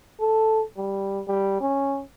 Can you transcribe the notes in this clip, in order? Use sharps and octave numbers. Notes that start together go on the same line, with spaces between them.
A4
G3
G3
C#4